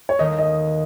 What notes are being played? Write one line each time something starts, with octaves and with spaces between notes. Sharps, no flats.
C#5
D#2 D#3 A3 D#4 D#5
D#5